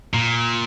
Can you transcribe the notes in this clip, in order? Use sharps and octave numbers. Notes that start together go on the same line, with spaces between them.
A#2